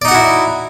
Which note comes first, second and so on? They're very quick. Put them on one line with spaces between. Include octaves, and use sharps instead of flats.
D5 D#4 F#5 F#4 E4